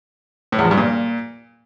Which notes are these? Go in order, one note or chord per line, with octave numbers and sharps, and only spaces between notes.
A2
E2
F3
G2
A#2